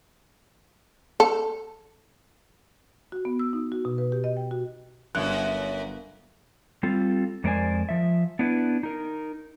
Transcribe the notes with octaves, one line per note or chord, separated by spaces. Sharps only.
A4
F#4
B3
E6
D#4
F#4
B2
B4
G4
D#5
G5
F#4
G1 F#2 F#6
G3 C4 F4 A4
F2 G#3 A#4 C5 D5 G#5
F3 E5
B3 D4 E4 B4
D#4 A#4